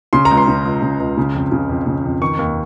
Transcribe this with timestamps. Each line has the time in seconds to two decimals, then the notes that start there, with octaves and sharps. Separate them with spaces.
0.13 C#3 C6
0.25 A#5
0.31 C#2
0.37 C6
0.48 C#3
0.65 C#2
0.82 C#3
1.00 C#2
1.18 C#3
1.35 F2
1.52 C#3
1.69 F2
1.87 C#3
2.04 F2
2.21 D#3 C#6
2.39 D#2